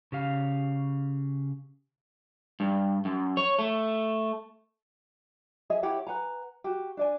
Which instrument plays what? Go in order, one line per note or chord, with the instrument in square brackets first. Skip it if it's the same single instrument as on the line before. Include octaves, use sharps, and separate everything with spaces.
[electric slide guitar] C#3 G4 F5
G2
F#2
C#5
A3
[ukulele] G#4 D#5 E5 G#5
E4 G4 C#5 F#5
B4 F#5 G#5 A#5
F#4 G4
D4 D5 G#5